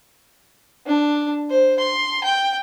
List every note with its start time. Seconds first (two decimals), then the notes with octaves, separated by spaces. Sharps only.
0.87 D4
1.50 C5
1.80 C6
2.24 G5